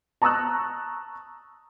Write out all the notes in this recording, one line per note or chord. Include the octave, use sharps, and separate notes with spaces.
A5 A#5 C#6 D#6 E6 F#6